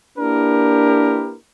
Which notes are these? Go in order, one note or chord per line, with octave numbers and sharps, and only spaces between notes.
A#3 D4 E4 G4 A#4 B4